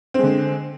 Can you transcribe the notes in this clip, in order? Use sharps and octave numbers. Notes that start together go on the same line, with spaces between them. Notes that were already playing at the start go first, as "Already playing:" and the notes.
D3 G#3 C4